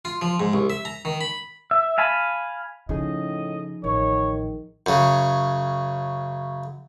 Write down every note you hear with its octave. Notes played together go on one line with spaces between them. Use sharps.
F4
F3
G#2
C2
E5
A#5
D#3
B5
E5
F5 G#5 A5 B5
A2 C#3 F3 D#4 G#4 D#5
A1 D#3 C#5
F#2 C#3